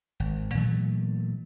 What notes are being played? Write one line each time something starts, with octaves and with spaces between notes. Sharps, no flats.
G#1
A#2 E3 F#3 A3